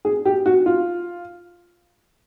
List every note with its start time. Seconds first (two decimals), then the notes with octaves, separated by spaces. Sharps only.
0.05 G#4
0.25 G4
0.46 F#4
0.66 F4